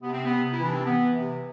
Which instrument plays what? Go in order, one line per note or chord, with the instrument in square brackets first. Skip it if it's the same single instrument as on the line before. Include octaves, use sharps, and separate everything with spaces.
[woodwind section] C3 B3
C4
B3
C3
E4
E3
D4
C4
E3 B3
C3